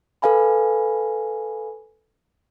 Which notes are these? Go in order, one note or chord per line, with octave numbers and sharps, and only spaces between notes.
A4 B4 F5 G#5 B5